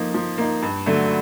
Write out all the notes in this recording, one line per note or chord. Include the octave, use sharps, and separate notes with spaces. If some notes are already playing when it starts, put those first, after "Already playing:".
Already playing: F3 A#3 D#4
F3
A#3 D#4
G2
D3 F#3 A3